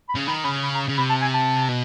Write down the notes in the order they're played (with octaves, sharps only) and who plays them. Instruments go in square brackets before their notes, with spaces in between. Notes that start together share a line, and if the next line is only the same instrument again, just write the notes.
[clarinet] B5
[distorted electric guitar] C#3
[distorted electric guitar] D#3 [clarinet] B5
[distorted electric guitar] C#3 [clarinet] B5
[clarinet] B5
A#5
[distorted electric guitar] C#3
[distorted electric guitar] C3 [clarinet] B5
[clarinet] A5
G#5
A5
[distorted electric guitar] B2